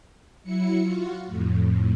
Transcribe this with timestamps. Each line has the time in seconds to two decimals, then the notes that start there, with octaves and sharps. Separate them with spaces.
0.43 F#3 E4 C#7
0.80 F4 F#4
1.26 F2 A2